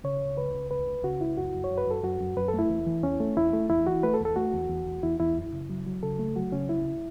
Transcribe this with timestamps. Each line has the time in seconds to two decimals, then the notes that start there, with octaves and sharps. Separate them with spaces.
0.04 C#3 C#5
0.21 C#2
0.37 C#2 B4
0.54 C#3
0.71 C#2 B4
0.87 C#2
1.03 C#3 F#4
1.20 C#2 E4
1.37 F#2 F#4
1.54 F#2
1.64 C#5
1.70 F#2
1.78 B4
1.87 F#2 A4
2.03 F#2 F#4
2.20 F#2
2.37 F#2 B4
2.48 A4
2.54 A3 E4
2.70 E2
2.87 E3
3.03 E2 C#4
3.20 A3
3.37 E2 E4
3.53 A3
3.70 E2 E4
3.87 E3 F#4
4.03 A3 B4
4.14 A4
4.20 E2
4.25 A4
4.36 A3 F#4
4.53 E2
4.69 E2
4.86 E2
5.03 E2 E4
5.19 E2 E4
5.36 F#2
5.53 C#3
5.70 F#3
5.86 F#3
6.03 C#3 A4
6.19 A3
6.36 F#3 F#4
6.52 C#3 C#4
6.69 C#2 E4